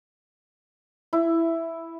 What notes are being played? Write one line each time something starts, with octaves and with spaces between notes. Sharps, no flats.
E4